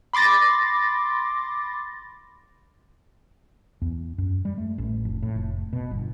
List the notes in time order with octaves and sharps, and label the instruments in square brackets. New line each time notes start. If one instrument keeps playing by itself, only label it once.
[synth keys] B5 C6 D6 A6 A#6
[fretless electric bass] E2
F#2
G3
A3
A1
F1
A2
F1
B2
G1